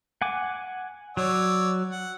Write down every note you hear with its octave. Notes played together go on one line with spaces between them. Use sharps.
F#5 G#5 D6
F#3 C#5 D5 E6
F#5